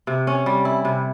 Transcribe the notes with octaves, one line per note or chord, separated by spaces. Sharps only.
C3
C#4
G3
E4
C3